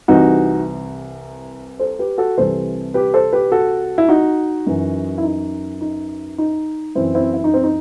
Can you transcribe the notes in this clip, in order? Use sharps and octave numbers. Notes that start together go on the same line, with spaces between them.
C2 C3 E3 D#4 F#4
A4 C5
G4 B4
F#4 A4
C2 C3 E3 A4 C5
G4 B4
A4 C5
G4 B4
F#4 A4
E4
D#4 F#4
F#2 E3
E4
D#4
D#4
D#4
F#2 E3 C4 E4
C4 E4
E4
D#4
C4
D#4